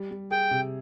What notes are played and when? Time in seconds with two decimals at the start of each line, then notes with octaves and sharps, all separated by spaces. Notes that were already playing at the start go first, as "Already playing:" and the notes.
Already playing: G3
0.11 G3
0.31 G#4 G5
0.51 C3